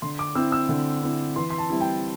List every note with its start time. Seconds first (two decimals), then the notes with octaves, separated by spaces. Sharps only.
0.02 D3 C6
0.19 D6
0.35 C4 E4 E6
0.52 E6
0.69 D3
1.03 C4 E4
1.36 E3 C6
1.50 C6
1.58 A5
1.70 G3 C4 E4
1.80 G5